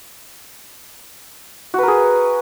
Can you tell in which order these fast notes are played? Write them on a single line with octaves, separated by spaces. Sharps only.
F#4 B4 A#4 G#4